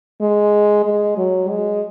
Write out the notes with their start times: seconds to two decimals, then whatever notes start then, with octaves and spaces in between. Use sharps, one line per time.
0.21 G#3
0.85 G#3
1.17 F#3
1.50 G#3